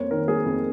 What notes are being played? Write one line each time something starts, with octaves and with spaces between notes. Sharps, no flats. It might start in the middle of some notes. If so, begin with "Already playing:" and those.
Already playing: F2 A#3 C5 C#5
D#3 A#4
A#3 G#4
F2 A#4